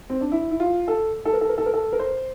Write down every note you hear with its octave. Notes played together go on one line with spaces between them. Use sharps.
C4
D4
E4
E4
F4
A4
A4
A#4
A4
A#4
A4
A#4
A4
A#4
C5